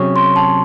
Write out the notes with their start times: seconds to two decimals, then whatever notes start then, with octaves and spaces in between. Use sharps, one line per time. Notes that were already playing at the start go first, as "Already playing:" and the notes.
Already playing: C3 F#3 C#4 G#4 C#6
0.16 C6
0.36 A5